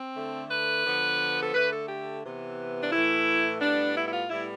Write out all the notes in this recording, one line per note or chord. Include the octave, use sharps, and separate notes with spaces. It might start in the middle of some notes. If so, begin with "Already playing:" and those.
Already playing: C4
D3 A3
B4
D3 F3 B3
A4
D3 A3 B4
A4
G4
C3 E3 B3
D4
A2 E3 A3 E4
A2 G3 B3 D4
E4
E4
F4
A2 G3 B3 E4